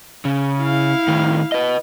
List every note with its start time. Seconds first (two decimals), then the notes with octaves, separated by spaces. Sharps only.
0.25 C#3
0.60 E4 F5
1.08 A2 D#3
1.52 B4 D#5